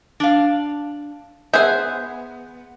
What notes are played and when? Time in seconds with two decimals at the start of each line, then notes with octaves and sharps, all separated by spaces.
0.20 D4 F5
1.54 B3 G#4 C5 E5 G6